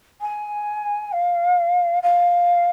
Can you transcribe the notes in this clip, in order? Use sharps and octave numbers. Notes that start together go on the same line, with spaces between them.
G#5
F5
F5